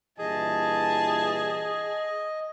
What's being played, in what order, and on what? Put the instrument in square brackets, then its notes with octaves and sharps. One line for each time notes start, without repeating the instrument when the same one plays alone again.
[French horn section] G2 A#2 E3 [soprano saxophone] G#4 [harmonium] D#5 [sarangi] A5